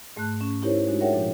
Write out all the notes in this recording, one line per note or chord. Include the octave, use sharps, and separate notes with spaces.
G#2 A3 A5 F#6
C#4
D#4 E4 G4 A#4 C5 C#5
G#3 D4 D#4 F#4
G#4 A#4 C#5 E5 F#5 G5
A#2 F3